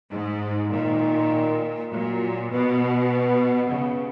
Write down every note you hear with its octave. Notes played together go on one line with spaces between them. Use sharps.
G#2
A#2 D#3
A#2 F#3
B2 B3
B3
C#3